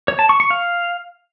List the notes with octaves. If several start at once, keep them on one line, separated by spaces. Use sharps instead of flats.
C#5
A5
C#6
C#6
F5